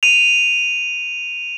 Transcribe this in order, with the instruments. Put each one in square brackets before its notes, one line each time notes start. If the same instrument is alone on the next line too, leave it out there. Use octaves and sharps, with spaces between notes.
[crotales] D#7 F7